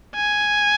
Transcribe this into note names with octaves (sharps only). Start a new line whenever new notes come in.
G#5